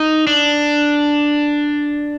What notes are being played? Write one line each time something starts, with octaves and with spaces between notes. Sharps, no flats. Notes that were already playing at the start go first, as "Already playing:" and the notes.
Already playing: D#4
D4